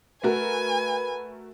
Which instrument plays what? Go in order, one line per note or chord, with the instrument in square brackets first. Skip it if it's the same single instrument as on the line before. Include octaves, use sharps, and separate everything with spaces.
[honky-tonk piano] A3 F#4 A#4 [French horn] B4 [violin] G#5